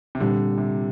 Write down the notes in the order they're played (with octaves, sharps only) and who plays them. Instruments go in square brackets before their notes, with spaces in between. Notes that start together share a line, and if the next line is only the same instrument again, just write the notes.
[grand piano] C3
[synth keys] A#2 G3 C4 G4 [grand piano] D3
[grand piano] C3